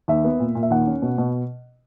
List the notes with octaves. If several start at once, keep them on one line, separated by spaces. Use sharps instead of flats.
D#2 E5
B3
A#2
A#2
E5
D#2 F#5
C#4
B2
B2